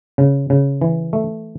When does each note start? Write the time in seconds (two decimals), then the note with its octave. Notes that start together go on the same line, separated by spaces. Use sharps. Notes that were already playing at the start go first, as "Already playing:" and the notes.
0.18 C#3
0.50 C#3
0.81 E3
1.13 A3